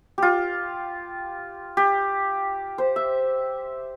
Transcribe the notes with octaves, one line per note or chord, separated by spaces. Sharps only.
F4 G4
G4
C5
E5